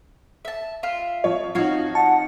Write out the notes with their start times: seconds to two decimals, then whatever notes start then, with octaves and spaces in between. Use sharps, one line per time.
0.45 E5 A5
0.83 F4 E5
1.24 F3 C#5
1.55 F3 C4 D#4 F#4 C#5 F5
1.95 F#5 A5